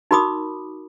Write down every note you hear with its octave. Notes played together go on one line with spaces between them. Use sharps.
D#4 F#4 A#4 B5 D6 D#6